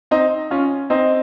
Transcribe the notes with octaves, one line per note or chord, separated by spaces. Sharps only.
C4 D#4
C#4 F4
C4 D#4